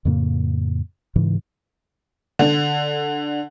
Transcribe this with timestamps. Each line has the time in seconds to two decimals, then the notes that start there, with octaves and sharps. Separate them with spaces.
0.05 F2 A2 C#3 A#3
1.16 G#2 C#3 E3
2.39 D3